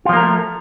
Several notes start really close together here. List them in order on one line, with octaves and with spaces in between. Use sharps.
F4 F3 A#3 A#4 A3